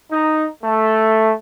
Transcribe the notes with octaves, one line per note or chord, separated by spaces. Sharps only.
D#4
A3